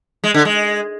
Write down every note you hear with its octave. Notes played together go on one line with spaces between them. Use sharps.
G#3
D3
G#3